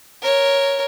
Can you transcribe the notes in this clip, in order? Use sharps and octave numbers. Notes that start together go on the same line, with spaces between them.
A#4 C#5